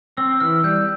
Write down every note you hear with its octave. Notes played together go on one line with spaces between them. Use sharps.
C4 E6
E3 F6
G3 G6